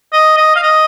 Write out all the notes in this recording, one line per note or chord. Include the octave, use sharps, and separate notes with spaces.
D#5
D#5
F5
D#5